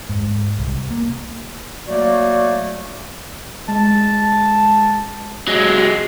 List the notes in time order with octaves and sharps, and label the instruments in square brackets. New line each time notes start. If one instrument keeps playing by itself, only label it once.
[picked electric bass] G#2
C2
A#3
[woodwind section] F#3 A3 A#3 F#4 D5
[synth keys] G#3 [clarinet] A5
[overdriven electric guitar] F#3 G#3